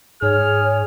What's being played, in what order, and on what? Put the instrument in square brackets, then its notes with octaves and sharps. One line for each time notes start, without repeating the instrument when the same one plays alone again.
[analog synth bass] G#2 [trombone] G#4 [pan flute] C#5 [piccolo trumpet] F6